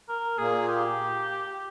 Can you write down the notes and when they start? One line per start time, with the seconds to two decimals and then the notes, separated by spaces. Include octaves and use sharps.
0.09 A#4
0.38 A#2 A#3 G#4
0.68 G4